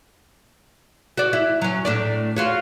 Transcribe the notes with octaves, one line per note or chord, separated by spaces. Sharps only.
F#4 D5
E4
F#3 C#4
A2 D4 D5
F4 F#4 C#5